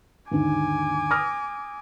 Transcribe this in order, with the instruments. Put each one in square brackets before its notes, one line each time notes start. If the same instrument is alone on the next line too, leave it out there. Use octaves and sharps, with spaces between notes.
[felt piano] D#2 G#2 D3 [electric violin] G#5 D6
[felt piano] D#6 F6 A#6